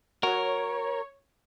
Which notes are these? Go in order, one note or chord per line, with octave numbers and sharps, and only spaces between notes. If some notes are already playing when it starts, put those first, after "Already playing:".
F#3 F#4 A#4 C#5